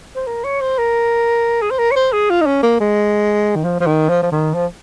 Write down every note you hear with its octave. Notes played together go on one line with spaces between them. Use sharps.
C5
A#4
C#5
C5
A#4
G#4
C5
A#4
C#5
C5
G#4
F4
D#4
C#4
A#3
G#3
D#3
F3
F3
D#3
F3
F3
D#3
F3